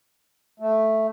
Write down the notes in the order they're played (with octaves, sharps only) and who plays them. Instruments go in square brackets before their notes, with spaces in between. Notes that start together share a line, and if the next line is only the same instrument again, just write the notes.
[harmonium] A3